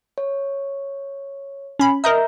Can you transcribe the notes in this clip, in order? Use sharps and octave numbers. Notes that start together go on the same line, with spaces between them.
C#5
C#4 B5
A#4 D#5 E5 A#5 D#6 G6